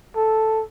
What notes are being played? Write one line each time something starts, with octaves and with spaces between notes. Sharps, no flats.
A4